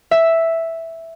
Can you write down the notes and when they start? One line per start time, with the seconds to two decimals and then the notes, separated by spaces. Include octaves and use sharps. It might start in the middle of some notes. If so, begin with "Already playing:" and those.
0.11 E5